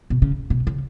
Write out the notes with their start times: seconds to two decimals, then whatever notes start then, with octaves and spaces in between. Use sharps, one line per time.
0.10 B2
0.22 C#3
0.50 B2
0.67 C#3